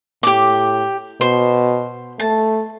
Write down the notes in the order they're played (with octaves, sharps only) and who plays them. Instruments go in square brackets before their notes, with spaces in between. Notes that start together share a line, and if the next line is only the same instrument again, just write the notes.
[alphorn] A2 [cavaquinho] G4 D6
[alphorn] B2 [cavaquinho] C5
[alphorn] A3 [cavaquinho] A5